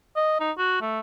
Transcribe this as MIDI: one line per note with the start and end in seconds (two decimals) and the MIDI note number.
0.16 0.39 75
0.40 0.51 63
0.58 0.79 66
0.81 1.00 57